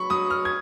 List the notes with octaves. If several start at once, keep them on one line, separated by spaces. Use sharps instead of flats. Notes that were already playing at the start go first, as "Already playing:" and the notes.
Already playing: F#3 B5 C#6
F#3 D#6
F6
G#6